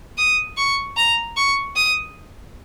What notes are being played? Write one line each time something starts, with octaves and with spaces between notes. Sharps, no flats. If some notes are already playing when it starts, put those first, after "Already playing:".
D#6
C#6
A#5
C#6
D#6